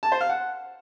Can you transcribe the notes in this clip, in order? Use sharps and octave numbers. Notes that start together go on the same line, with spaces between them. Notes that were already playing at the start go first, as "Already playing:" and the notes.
A5
C5
F5
F#5